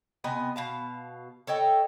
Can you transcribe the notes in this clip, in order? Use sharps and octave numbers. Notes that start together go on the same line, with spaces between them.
C3 B3 D#5 G#5
B2 F5 A5
A4 C#5 D#5 G5